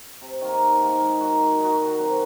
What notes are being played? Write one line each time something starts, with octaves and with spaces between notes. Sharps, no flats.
C3
D#3 A#3
C3
D#3 A#3
G#3
D#4 F#4
G#3
D#4 F#4
D#3
F#3 C4